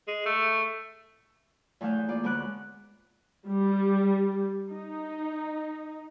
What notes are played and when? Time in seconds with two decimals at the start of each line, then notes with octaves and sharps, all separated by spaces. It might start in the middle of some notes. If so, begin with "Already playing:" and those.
0.08 G#3
0.26 A3
1.81 E2 E3 A3 F5 G6
2.08 A#3 F4 D5
2.24 D2 G#3 B3 C#6 D6 F#6
3.48 G3
4.69 D#4